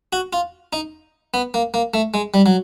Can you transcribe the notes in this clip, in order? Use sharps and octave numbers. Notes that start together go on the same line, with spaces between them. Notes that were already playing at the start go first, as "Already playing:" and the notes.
F#4
F4
D#4
B3
A#3
A#3
A3
G#3
G3
F#3